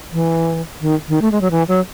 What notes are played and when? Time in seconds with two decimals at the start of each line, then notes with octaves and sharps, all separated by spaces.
0.12 E3
0.81 D#3
1.09 D#3
1.22 A3
1.32 G#3
1.41 F#3
1.51 E3
1.68 F#3